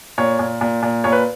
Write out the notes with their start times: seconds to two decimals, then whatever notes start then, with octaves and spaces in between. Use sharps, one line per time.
0.18 A#2 C#5
0.39 A#2
0.61 A#2
0.83 A#2
1.04 A#2 C#5
1.12 B4